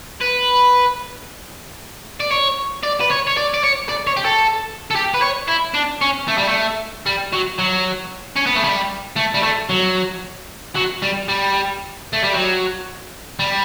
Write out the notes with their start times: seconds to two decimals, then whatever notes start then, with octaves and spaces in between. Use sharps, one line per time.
0.21 B4
2.20 D5
2.31 C#5
2.83 D5
3.01 B4
3.11 C#5
3.27 C#5
3.37 D5
3.54 D5
3.64 C#5
3.89 D5
4.07 C#5
4.17 G4
4.25 A4
4.90 A4
4.95 G4
5.14 B4
5.22 C#5
5.48 E4
5.74 D4
6.01 C#4
6.28 A3
6.37 G3
6.48 A3
7.06 G3
7.33 F#3
7.59 F#3
8.36 C#4
8.46 B3
8.56 A3
8.64 G3
9.17 A3
9.35 G3
9.43 A3
9.69 F#3
10.76 F#3
11.02 G3
11.28 G3
12.13 A3
12.24 G3
12.33 F#3
13.39 G3